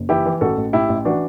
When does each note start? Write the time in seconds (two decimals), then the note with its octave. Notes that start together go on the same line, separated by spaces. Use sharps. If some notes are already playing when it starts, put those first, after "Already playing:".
Already playing: F#1
0.09 E3 E4 G4
0.26 E3
0.41 A1 F#4 A4
0.57 A1
0.73 A2 E4 G4
0.89 A1
1.05 E3 D4 F#4